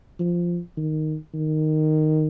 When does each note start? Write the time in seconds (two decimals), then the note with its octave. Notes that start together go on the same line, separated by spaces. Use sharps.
0.20 F3
0.77 D#3
1.34 D#3